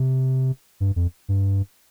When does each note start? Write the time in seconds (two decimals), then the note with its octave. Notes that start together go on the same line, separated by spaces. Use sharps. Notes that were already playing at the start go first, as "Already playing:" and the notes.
Already playing: C3
0.80 G2
0.96 F2
1.28 G2